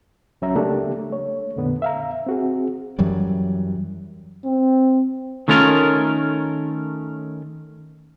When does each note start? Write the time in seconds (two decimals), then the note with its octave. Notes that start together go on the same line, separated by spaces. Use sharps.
0.42 C#2 F#3 C#4 E5 A#5
0.55 C#3 A3 A#3 D4 G4
1.09 A3 C#5
1.56 F2 A#2 D3 B3
1.82 E5 F5 A#5
2.26 C4 F#4 G#4
2.99 F#2 E3 F#3 G3
4.45 C4
5.48 D#3 A3 C#4 F4 A#4